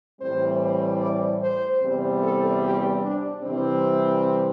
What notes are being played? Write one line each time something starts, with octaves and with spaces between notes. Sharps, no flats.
A2 E3 G3 C4 C5
D5
C5
E2 C3 G3 C4
A4
G4
D4
C3 E3 G3 C4